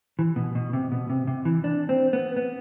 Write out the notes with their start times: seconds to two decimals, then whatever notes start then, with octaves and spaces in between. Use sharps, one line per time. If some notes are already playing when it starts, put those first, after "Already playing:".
0.19 E3
0.36 B2
0.55 B2
0.73 C3
0.92 B2
1.10 C3
1.27 C3
1.45 E3
1.64 D4
1.89 C4
2.13 B3
2.36 B3